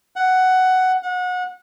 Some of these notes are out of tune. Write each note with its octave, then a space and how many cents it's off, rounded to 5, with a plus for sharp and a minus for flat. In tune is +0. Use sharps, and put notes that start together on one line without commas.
F#5 +10
F#5 -30